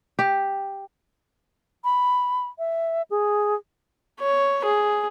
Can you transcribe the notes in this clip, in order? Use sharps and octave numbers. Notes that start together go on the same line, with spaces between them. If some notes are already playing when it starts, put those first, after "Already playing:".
G4
B5
E5
G#4
C#5
G#4